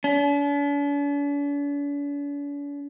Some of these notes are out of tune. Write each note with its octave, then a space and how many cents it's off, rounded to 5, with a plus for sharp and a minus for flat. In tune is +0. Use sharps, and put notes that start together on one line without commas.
D4 -45